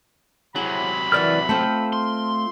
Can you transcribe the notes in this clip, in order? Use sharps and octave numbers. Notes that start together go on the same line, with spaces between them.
C3 F#3 E4 G#4 F#5 B5
E3 A#4 D5 E5 F#5 F6
A3 C4 F4 A4 C5 G5
C6